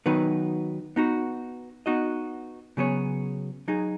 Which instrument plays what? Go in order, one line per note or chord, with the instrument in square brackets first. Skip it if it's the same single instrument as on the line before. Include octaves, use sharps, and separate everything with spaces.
[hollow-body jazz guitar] D#3 F#3 B3 D#4 B4
B3 D#4 F#4
B3 D#4 F#4 D#5
C#3 F#3 B3 G#4 C#5
F#3 D#4 G#4